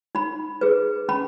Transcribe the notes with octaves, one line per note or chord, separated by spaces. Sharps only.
D#4 B5
G#4 B4
C#4 B5